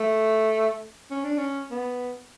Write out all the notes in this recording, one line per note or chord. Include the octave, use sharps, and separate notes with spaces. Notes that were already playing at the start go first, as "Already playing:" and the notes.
Already playing: A3
C#4
D4
C#4
B3